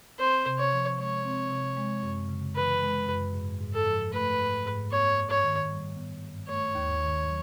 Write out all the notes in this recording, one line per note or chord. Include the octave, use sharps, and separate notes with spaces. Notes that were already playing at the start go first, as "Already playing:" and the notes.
C4 C5
C3
C#5
F3
G#3 C#5
C4
C3
G#3
F#2
C#3
E3 B4
G#3
F#2
G#2
G#2
A4
F3
A3 B4
G#2
G#2
B3 C#5
G2
C#5
D#3
G3
B3
G2
A3 C#5
D#2
D#3
F#3